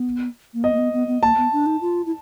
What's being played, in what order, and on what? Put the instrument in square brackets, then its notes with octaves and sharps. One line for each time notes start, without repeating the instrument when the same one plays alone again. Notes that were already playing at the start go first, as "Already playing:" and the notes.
Already playing: [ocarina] B3
A#3
[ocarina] B3 [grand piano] D#5
[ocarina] A#3
B3
B3
B3
[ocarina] A#3 [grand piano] A5
[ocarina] B3
D4
D#4
F4
E4